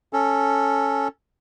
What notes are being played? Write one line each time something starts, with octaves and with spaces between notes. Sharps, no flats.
C#4 A4